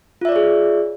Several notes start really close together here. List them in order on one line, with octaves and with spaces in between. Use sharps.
F4 E5 D5 C#5 G#4